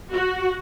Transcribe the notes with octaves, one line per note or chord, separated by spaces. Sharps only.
F#4